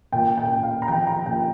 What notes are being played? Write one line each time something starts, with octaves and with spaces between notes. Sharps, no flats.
A#2 G5
G5
A#2
F5
A#5
F3 G5
A#5
A#2 G5